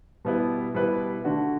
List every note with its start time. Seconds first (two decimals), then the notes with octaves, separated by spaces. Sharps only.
0.25 B2 G3 B3 E4 B4
0.74 B2 G3 B3 E4 B4
1.25 D3 A3 D4 F#4